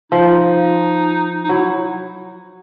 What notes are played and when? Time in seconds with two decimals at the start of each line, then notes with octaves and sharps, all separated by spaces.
0.11 F3 D#4
1.44 D#4
1.49 F#3 E4